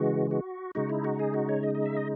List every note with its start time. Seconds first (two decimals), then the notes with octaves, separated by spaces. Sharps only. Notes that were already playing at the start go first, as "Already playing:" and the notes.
Already playing: C#3 E3 G#3 F#4
0.31 F#4
0.75 C#3 G#3 D#4 F#4
0.90 E4
1.04 F#4
1.19 G#4
1.34 F#4
1.49 C#5
1.63 D#5
1.75 D#5
1.85 E5
1.96 D#5